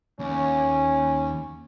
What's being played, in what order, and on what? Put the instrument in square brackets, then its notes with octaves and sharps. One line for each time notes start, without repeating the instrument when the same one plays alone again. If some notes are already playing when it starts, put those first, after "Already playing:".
[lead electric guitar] D#2 [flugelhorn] C#4